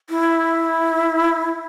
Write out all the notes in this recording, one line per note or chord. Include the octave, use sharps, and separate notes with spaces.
E4